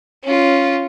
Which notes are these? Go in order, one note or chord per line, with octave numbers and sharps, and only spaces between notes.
C#4 F4